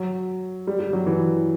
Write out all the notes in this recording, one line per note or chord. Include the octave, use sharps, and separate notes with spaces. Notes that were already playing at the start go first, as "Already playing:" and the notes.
Already playing: F#3
G3
G3
F#3
E3